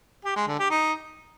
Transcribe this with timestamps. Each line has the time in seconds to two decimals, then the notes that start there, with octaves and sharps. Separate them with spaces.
0.25 G4
0.36 G#3
0.47 D3
0.59 G4
0.70 D#4